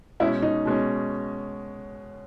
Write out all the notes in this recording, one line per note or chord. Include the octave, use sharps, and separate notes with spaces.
B2 G#3 C#4 E4
D#4
B2 G#3 C#4